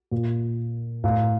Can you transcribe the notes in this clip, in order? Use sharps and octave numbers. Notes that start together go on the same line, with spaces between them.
A#2
A2 F5